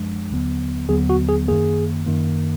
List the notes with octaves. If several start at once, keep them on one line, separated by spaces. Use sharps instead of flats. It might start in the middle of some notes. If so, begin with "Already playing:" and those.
Already playing: F#2 F3 G#3 D4
D#2 D3 F#3 B3
D#2 D3 F#3 B3 G#4
F#4
G#4
F#2 D#3 A#3 G#4
F#2 D#3 A#3